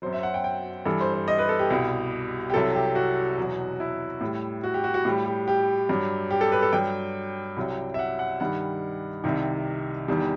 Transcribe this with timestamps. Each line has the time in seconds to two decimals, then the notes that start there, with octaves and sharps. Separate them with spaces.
0.02 F#2 F#3 C5
0.13 E5
0.23 F#5
0.34 G5
0.44 G5
0.86 G2 E3 G3 A4
1.01 C5
1.14 C5
1.28 D#5
1.38 B4
1.49 A4
1.59 G4
1.70 C2 B2 G3
2.50 G4
2.54 C2 C3 F#3 A4
2.75 G4
2.95 F#4
3.38 E2 B2 F#3
3.80 E4
4.21 A2 G3
4.63 F#4
4.74 G4
4.84 F#4
4.94 F#4
5.05 A2 G3 G4
5.26 G4
5.48 G4
5.89 G2 F#3
6.30 G4
6.41 A4
6.52 B4
6.62 A4
6.73 G2 F#3 G5
7.57 C2 C3 F#3
7.94 E5
7.99 F#5
8.19 F#5
8.40 G2 D#3 G3 F#5
9.24 C2 C3 D#3
10.08 E2 D#3 G3